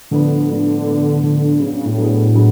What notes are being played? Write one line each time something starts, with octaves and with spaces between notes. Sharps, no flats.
A2 D3 F3 B3 D4
A2 F3 B3 D4
A2 F3 B3 D4
A2 D3 F3 B3 D4
C#3 F#3 B3 D4 G#4
C#3
A2
F#3 B3 D4 G#4
F#3 B3 D4 G#4